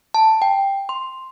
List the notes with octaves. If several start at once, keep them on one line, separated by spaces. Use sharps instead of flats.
A5
G5
C6